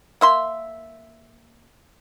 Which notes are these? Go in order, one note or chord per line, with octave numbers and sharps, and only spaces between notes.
A#3 E5 C6